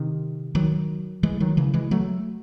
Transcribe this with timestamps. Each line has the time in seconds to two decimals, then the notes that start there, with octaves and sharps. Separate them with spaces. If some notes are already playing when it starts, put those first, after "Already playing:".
Already playing: C3 D#3
0.55 D#3 F#3
1.23 E3 G#3
1.40 D#3 F#3
1.57 C#3 E3
1.74 E3 G#3
1.91 F#3 A3